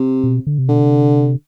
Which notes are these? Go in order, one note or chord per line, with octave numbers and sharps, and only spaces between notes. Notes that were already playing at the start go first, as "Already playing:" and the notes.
Already playing: C3
B2
D3
C3
B2 D3
C3